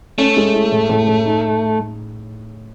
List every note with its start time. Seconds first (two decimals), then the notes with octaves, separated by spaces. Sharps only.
0.18 A3 C#4
0.37 G#3
0.54 E4
0.72 A2
0.89 A2
1.08 A2
1.25 D#4